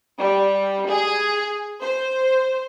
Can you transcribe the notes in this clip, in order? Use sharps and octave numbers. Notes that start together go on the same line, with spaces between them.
G3
G#4
C5